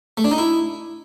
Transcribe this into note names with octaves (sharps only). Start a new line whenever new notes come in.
A3
D4
D#4
E4